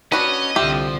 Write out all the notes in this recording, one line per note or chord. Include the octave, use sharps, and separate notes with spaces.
C#4 D4 F#4 B4 D#5
C2 D3 F3 G4 E5